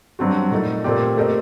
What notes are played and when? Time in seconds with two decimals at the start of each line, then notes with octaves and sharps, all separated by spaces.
0.19 G2 F#3 C4 F#4
0.51 A#2 A3 D#4 A4
0.84 A#2 A3 C4 G4 D5
1.17 A3 C4 G4 A#4 D#5